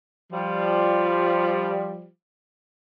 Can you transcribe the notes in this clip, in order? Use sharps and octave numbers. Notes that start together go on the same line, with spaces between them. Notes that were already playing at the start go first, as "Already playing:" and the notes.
F3 G3